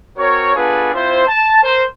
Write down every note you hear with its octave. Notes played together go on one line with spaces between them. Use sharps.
C4 F#4 A#4 C#5
B3 D4 F4 G#4 A4 B4
C4 E4 F4 C5
A5
A#4 C5